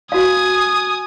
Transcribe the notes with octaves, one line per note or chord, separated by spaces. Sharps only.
F#4 F5 G#5 D#6